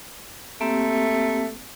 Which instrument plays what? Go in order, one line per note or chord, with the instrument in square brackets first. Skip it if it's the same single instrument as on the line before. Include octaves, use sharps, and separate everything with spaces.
[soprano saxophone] A3 [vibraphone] A#3 C4 G4